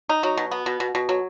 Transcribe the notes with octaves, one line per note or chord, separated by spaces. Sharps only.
D#4
F#3
B2
B3
B2
B2
B2
F#3